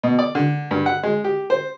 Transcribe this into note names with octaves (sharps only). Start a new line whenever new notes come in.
B2
D5
D3
G2
F#5
G#3
G4
C5